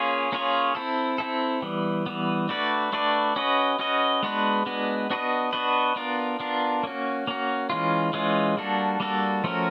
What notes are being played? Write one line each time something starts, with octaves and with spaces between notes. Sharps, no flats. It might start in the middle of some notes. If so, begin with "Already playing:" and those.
Already playing: A#3 C#4 F4 G#4 C#5
A#3 C#4 F4 G#4 C#5
C4 E4 A4
C4 E4 A4
E3 G3 B3
E3 G3 B3
A3 D4 F#4 B4 D5
A3 D4 F#4 B4 D5
C#4 F#4 B4 D#5
C#4 F#4 B4 D#5
G#3 B3 D4 F#4 B4
G#3 B3 D4 F#4 B4
B3 D4 F#4 B4 D#5
B3 D4 F#4 B4 D#5
B3 D4 F4 A#4
B3 D4 F4 A#4
A#3 C#4 F#4
A#3 C#4 F#4
E3 G#3 C#4 F4
E3 G#3 C#4 F4
G3 A#3 D4 F#4 A4
G3 A#3 D4 F#4 A4
F3 A3 C#4 F#4 A#4